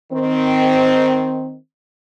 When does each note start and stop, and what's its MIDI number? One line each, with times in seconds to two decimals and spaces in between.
0.12 1.55 51
0.12 1.55 60